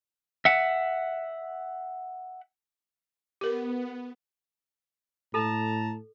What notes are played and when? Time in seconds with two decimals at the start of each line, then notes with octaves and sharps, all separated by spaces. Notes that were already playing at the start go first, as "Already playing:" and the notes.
0.45 E5 F#5
3.41 B3 G4 A#4
5.34 A2 A4 A5 A#5